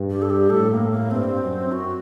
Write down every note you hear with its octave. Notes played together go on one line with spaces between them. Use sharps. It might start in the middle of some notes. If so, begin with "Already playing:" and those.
Already playing: G2
G4
A4
G4
A2 A4
A#3
A#3
G2 C4
F#2
F#4